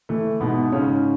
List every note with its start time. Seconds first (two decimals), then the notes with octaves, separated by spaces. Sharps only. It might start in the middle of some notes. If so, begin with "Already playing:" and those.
0.09 E3 A3
0.41 G#2 B2 B3
0.72 G#2 C#3 C#4